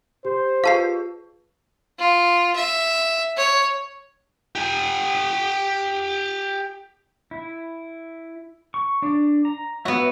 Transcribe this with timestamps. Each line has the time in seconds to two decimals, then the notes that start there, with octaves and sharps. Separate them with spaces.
0.25 G4 C5
0.64 F4 G#4 B4 F5 A5 C7
1.99 F4
2.56 E5
3.37 C#5
4.55 G4 G#5
7.31 E4
8.74 C#6
9.02 D4 D5
9.45 A#5
9.85 B3 F#4 B4 C#5 E5